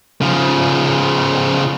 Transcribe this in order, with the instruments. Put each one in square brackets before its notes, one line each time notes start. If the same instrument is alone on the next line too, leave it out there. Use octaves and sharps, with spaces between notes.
[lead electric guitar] C#3 F3